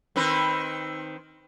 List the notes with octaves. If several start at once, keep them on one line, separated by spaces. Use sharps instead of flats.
D#3 C4 B4